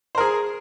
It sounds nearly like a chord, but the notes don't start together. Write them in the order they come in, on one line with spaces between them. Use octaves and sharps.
C5 A#4 G#4